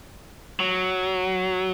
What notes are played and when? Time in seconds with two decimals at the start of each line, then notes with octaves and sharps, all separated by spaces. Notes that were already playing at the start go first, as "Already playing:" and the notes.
0.60 F#3